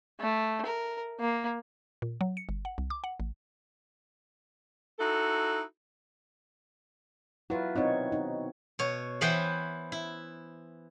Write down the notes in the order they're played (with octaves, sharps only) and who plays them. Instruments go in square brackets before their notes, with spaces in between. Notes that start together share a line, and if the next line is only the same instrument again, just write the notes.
[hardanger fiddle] A3
A#4
A#3
[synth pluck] A#2
F#3
C#7
G1
F#5
C2
D6
F#5
A1
[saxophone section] D#4 E4 F#4 A4
[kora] F#3 F4 [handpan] E4 B4
[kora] B2 [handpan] C4 D#4 C#5
[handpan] D#4
[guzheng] B2 C#5
E3 B3 E4 B4 C5 G5
E4